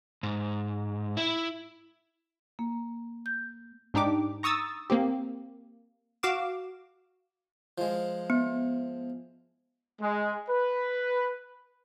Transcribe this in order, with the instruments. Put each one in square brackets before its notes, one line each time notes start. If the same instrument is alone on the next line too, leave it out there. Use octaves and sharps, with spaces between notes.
[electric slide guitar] G#2
E4
[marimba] A#3
G6
[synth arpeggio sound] G#2 D4 D#4 G4 D6
A#5 C#6 D#6 E6 A6
A#3 C4 G4
F#4 F5 D6 E7
[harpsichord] F3 G#3
[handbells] B3
[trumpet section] G#3
B4